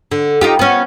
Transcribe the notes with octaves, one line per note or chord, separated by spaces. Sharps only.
D3
D#4 F4 G4
B3 C#4